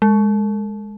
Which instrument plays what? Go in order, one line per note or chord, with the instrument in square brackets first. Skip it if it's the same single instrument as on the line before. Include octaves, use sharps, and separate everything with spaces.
[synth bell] G#3